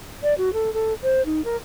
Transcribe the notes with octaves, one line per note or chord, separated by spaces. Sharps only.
D5
F#4
A4
A4
C5
D#4
A#4